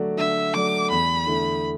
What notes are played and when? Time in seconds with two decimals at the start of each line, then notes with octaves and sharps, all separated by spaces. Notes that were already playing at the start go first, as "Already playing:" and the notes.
Already playing: D3 F#3 A3 F#4 D5
0.18 D3 E5
0.54 F#3 A3 F#4 D5 D6
0.90 E2 B5
1.27 D3 A3 E4